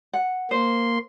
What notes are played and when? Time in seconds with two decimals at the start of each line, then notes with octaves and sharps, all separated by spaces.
0.13 F#5
0.51 A#3 C5 C6